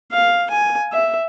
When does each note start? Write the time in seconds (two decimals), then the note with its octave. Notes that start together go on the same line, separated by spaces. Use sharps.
0.12 F5
0.50 G#5
0.93 E5